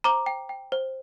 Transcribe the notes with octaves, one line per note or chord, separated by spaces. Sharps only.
C5 A#5 D6
G5
G5
C5